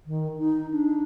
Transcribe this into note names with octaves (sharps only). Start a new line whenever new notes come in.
D#3
D#4
D4